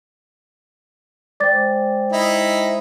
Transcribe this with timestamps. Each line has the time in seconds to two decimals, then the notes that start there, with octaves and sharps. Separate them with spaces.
1.40 G#3 C5 D5 G5 D6 A6
2.12 D#4 E4